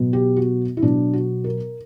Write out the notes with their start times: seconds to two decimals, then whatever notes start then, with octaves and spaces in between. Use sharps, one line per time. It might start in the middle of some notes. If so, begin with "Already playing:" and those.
Already playing: B2 F#3 B3
0.13 G4
0.37 F#4
0.77 E4
0.82 B2 F#3 B3 D4
1.13 F#4
1.44 A#4